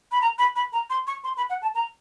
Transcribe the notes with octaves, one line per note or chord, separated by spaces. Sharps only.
B5
A#5
B5
B5
A#5
C6
C#6
C6
B5
F#5
A5
A#5